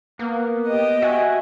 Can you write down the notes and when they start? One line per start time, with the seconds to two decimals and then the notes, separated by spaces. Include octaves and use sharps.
0.19 A#3 B3
0.67 G4 D#5
1.02 F#4 E5 F#5 G#5